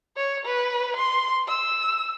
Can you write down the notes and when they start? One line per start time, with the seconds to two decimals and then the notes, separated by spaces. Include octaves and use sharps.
0.17 C#5
0.45 B4
0.96 C6
1.48 E6